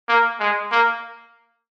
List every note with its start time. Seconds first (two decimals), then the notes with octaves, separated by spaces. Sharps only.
0.08 A#3
0.40 G#3
0.71 A#3